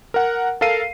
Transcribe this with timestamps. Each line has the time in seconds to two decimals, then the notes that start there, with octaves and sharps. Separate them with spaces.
0.14 A#4 F#5
0.61 A4 A#4 F5 C7 D#7